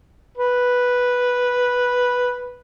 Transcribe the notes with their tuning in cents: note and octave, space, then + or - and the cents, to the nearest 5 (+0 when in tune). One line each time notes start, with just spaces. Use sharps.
B4 -5